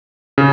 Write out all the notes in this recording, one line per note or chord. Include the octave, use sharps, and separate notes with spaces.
C#3